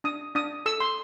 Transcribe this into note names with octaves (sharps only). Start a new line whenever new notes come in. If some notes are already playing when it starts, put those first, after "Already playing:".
D4 D#6
D4 D#6
A4 E6
C6